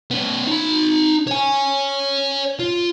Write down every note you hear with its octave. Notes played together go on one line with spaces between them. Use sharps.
B3 C#4
D#4 B5
C#5 G#5
F4